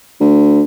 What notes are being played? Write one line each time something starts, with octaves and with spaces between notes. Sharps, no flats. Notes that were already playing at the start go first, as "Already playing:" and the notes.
D2